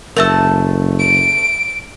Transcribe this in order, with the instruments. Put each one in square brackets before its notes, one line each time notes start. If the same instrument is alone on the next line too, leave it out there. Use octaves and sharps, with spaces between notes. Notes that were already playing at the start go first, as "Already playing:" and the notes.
[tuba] F#1 [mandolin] A3 A5 [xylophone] A#4 E5 E6
[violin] D7